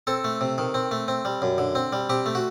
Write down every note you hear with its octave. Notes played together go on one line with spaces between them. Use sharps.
C4 A4
A3
C3
D#3
C4
A3
C4
G3
F#2
D3
C4
G3
C4 G4
A3
F#4